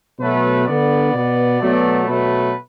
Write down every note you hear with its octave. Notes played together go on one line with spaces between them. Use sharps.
B2 F#3 A3 B4
D3 B3 D5
B2 B3
B2 F#3 A3
B2 F#3 A3 B4